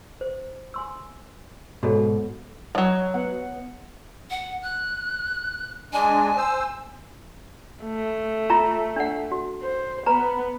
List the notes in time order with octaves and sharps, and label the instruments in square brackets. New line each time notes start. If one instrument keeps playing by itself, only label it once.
[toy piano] C5
G#5 C6 E6
[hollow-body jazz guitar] G#2 B2 [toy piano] F#4 A4 C#5
[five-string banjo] F3 F#3 [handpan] C#5 D#5
[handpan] B3 F#5
[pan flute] F#5
F#6
[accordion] G#3 D4 [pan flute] G#5
[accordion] C5 E6
[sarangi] A3
[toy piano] F4 E5 A#5
D4 F#5
F#4
[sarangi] C5
[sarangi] B3 [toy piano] B4 A#5